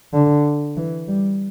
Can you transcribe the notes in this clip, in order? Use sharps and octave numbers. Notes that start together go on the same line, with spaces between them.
D3
E3
G3